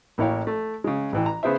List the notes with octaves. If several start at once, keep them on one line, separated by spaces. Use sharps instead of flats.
A1 A#3 E4 C#5 F5 G5
A3
C#3 G#3
A1 E3 G5
A#5
C#3 B3 G#4 C5 E5